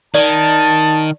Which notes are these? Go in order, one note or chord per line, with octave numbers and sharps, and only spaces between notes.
D#3 D5 A5